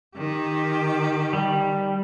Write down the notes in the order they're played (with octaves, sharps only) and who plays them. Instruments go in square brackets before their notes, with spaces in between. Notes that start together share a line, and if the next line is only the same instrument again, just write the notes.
[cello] D#3 G4
[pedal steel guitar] G3